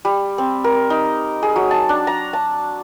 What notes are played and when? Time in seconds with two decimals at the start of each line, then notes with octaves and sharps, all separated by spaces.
0.05 G3
0.38 C4
0.64 A#4
0.90 D#4
1.43 G#4
1.56 F#3
1.71 A5
1.89 D4
2.07 A#5
2.33 A5